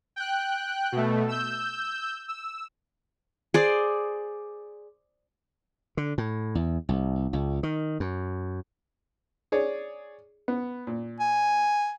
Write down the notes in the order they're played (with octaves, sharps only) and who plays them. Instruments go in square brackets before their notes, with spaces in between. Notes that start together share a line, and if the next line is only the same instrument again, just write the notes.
[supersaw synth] G5 F#6
B2 A3
E6 G6
E6
[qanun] G#4 C5 D5
[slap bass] D3
A2
E2
C2
C#2
D#3
F#2
[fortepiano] G#4 C#5 D5
B3
A#2
[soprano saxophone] G#5